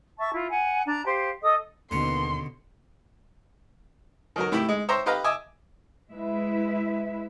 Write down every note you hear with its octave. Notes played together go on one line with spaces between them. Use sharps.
E5 A5 C#6
E4 F4
F#5 G#5
D4 A5 A#5
G4 C5 F5
A4 D#5 D#6
D#2 B2 D3 C#4 C6
D#3 F#3 A#4
A2 E4 G4 B5
G#3
C5 C#5 E5 G5 A#5 C6
D#4 G4 B4 F5 A#5
D#5 E5 G#5 D6
G#3 E4 B4 E5